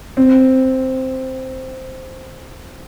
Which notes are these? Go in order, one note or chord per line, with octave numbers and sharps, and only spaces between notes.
C4